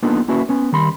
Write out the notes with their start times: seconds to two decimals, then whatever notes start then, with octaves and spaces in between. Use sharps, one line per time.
0.03 A#3 B3 D4 D#4 F4 A4
0.28 A#3 C#4 E4 F#4 B4
0.49 B3 C#4
0.72 D#3 G3 B5 C6